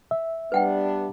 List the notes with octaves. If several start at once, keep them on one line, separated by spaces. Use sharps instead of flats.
E5
G3 B3 D4 B4 F#5 G5